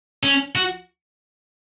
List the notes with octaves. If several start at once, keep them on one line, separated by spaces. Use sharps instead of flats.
C#4
F#4